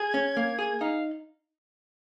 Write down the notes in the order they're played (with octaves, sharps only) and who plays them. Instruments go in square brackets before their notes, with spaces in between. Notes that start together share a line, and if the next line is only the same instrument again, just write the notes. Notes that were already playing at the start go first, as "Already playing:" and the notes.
Already playing: [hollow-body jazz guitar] G#4 [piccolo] G#6
[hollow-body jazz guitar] C#4
A#3
G#4
[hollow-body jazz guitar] D#4 [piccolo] F5